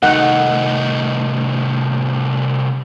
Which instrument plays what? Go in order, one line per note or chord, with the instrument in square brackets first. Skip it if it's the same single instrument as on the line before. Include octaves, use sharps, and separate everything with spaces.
[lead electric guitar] C2 A3 [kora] D#3 D#4 [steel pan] F#5